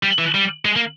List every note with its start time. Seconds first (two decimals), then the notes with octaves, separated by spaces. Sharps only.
0.03 G3
0.18 E3
0.34 G3
0.65 G#3
0.76 A#3